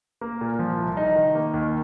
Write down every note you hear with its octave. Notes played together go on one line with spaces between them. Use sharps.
A#3
A#2
F3
C2
D#4
D#3
A#3
D#2